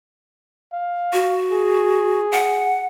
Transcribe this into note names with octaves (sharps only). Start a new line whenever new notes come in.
F5
F#4
G#4
F#5